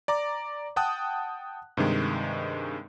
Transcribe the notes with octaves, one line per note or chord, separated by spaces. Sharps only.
D5 A#5 D6
F#5 G5 A5 D#6 F#6
G2 C3 D#3 G#3